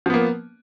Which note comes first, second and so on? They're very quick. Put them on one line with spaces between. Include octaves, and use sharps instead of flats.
F3 B3 A#3